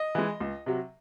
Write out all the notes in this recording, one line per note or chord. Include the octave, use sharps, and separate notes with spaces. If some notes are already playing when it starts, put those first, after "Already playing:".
Already playing: D#5
E3 G#3
C#2
C3 F#3